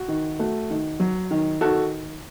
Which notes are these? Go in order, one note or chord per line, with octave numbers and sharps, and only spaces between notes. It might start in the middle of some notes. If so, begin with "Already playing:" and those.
Already playing: F#4
D#3
A3 F#4
D#3
F#3
D#3
D#3 F#4 A4